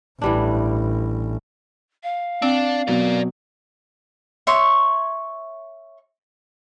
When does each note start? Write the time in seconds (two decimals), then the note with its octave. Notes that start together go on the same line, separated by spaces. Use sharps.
0.22 A1 E3 G3 D4
2.03 F5
2.42 C4 D4
2.87 B2 F#3 A#4 D5
4.47 C#5 E5 C6 C#6